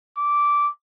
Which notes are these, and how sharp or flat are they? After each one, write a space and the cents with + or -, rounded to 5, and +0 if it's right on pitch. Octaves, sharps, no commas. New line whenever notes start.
D6 -10